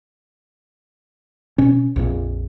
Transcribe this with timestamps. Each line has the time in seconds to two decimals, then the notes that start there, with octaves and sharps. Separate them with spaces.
1.58 B2 C#4
1.96 A#1 F2 A#2